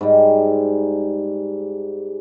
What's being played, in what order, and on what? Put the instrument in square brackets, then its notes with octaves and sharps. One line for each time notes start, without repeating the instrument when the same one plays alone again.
[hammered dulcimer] G#2 G3